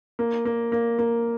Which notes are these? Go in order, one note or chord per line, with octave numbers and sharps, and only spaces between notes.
A#3
A#3
A#3
A#3